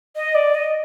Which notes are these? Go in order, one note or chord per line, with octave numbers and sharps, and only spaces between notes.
D#5
D5
D#5